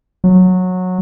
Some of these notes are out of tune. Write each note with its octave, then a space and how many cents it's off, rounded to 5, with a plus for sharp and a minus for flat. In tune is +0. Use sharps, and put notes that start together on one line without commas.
F#3 -15